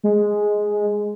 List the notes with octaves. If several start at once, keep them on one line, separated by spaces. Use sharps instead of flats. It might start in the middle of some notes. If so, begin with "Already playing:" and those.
G#3